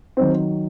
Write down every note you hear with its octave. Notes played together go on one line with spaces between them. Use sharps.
D#3 F#3 C4